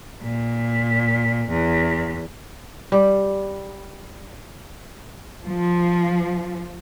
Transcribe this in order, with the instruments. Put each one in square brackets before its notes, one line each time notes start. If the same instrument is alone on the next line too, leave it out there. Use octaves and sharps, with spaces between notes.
[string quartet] A#2
E2
[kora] G3
[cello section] F3